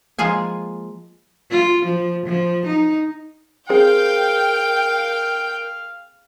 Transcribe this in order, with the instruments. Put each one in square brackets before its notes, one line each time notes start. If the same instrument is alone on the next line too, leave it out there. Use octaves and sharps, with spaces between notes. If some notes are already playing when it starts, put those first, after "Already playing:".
[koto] F3 G#3 A#3 F4 G#4 G#5
[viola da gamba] F4
F3
F3
D#4
[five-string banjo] C4 G#4 [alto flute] A#4 [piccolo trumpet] F5 [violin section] G5